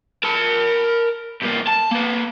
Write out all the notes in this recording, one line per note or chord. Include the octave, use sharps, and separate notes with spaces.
A#4 A5
G2 A#3
A5
A#3 B4